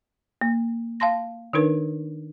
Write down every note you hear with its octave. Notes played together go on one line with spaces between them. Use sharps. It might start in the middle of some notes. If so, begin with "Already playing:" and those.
A#3
F5 A5 C6 A#6
D#3 D4 D#4 A#4 B4